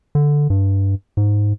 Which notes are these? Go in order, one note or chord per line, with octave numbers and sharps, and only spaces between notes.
D3
G2
G#2